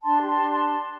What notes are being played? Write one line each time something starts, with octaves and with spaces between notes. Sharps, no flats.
D4 A5 C6
G4
A5 C6
D4
A5 C6